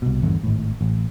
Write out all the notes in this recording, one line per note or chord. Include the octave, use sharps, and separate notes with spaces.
C2 B2
G#1 E2 G2 D3
G#1 A2
A1